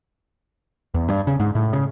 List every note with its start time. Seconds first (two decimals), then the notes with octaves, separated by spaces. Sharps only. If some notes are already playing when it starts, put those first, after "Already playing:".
0.94 E2
1.09 G2
1.27 C#3
1.40 G#2
1.55 A2
1.73 C#3